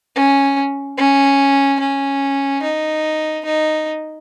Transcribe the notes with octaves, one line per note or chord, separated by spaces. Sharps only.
C#4
C#4
C#4
D#4
D#4